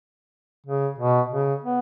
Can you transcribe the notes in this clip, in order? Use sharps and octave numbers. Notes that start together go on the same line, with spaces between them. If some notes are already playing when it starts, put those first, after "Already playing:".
C#3
B2
C#3
B3